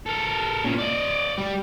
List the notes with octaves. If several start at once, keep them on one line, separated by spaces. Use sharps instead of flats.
A4 A#4
A#2 C#3
D5 D#5
G3